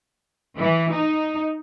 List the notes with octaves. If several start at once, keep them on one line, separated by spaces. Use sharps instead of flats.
E3
D#4